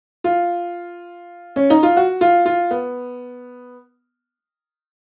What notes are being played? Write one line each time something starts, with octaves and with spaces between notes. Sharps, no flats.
F4
C#4
D#4
F4
F#4
F4
F4
B3